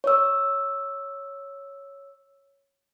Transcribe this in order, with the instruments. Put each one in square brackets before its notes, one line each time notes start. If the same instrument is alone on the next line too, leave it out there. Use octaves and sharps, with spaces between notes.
[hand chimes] C#5 E6